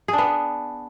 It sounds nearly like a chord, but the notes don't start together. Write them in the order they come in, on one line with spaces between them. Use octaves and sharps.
G#4 D4 B3